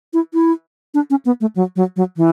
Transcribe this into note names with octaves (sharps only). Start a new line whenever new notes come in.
E4
E4
D4
C#4
B3
A3
F#3
F#3
F#3
E3